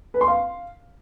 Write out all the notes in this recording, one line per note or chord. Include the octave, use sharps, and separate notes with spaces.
B4
C6
F5